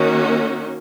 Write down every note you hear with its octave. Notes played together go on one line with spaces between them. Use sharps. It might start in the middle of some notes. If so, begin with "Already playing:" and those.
Already playing: D#3 A#3 C#4 F#4